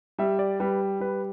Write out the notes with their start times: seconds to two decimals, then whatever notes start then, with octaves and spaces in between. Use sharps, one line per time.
0.18 G3 E5
0.39 D5
0.60 G3 B4
1.00 G3 B4